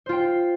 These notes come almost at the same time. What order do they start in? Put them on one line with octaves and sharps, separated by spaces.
C5 F4 G5